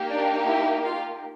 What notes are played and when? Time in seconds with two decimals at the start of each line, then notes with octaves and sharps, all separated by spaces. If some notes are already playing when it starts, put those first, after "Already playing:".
Already playing: A#3 D#4 G4
0.10 D4 D5
0.47 E4 E5
0.85 F4 F5